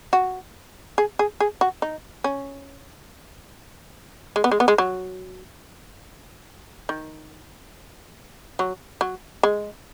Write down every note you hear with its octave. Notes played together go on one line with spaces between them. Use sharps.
F#4
G#4
G#4
G#4
F#4
D#4
C#4
G#3
B3
G#3
B3
G#3
F#3
D#3
F#3
F#3
G#3